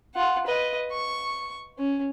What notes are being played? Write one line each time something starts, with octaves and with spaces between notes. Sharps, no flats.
F4 F#5
B4 D#5
C#6
C#4